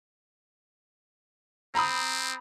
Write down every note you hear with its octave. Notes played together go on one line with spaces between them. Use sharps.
C4 A#5 B5 D#6